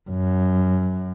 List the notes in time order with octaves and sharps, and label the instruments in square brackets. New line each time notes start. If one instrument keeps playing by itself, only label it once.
[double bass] F#2